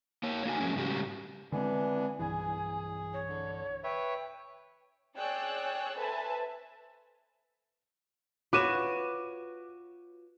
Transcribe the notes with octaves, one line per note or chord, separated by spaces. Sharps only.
A#3 C#5
A#3 D#4 F#4 G#5
F3 F#3 G#3 A#3 C#4
G#2 C#3 G3 C#4 F#4 G4
D3 E3 G#3 B3 C4 D4 G#5
B1 G2 E3 G#4 G#5
C#5
D3
B4 C#5 E5 G5
G#4 C#5 D5 G5 E6 F#6
A4 B4 C5 E5 G#5 A5
F4 F#4 B4 C#5 D6 D#7 E7